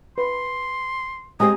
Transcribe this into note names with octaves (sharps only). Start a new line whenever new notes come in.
B4 C6
G#3 C4 G4 G#5 A#5 D#6